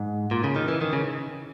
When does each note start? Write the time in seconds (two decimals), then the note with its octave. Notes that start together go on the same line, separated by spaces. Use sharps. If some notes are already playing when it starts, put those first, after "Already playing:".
Already playing: G#2
0.31 A#2
0.44 C#3
0.56 D#3
0.68 E3
0.81 D#3
0.93 C#3